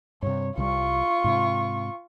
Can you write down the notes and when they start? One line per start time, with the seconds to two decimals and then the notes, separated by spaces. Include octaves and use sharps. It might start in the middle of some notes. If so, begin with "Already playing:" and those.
0.22 G2 C3 C#5
0.57 C2 E3 G3 F4 C#6
1.24 G#2 C3